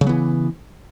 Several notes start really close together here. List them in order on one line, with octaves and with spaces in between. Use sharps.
C#3 F#3 B3 E3